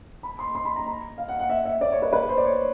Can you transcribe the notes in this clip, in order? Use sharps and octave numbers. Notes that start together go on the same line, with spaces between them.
B5
C6
C6
B5
A#5
A#5
F5
F#5
F#5
E5
E5
D5
C#5
B4
B4
C5
D5
C#5